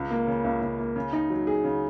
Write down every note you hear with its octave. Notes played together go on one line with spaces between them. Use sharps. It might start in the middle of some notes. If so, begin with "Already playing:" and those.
Already playing: C#2
A#3
C#3
C#2
C#2
A#3
C#3
D#4
F#3
G#4
C#3